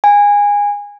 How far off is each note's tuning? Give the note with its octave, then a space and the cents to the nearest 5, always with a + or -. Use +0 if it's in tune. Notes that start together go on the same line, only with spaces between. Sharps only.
G#5 -20